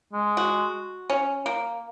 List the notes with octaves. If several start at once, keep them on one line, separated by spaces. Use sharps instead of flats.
G#3
F#4
C#4
A#3